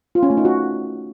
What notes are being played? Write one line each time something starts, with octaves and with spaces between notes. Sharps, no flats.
F4
C#4
A3
D#4
F#4